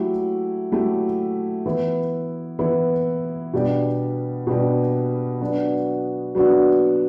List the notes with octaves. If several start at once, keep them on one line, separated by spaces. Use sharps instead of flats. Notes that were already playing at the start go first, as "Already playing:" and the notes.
Already playing: F#3 A3 E4 G4
F#3 A3 E4 G4
E3 B3 E4
E3 B3 E4
B2 G3 B3 D4 G4
B2 G3 B3 D4 G4
F#3 B3 D4 F#4
F#3 B3 D4 F#4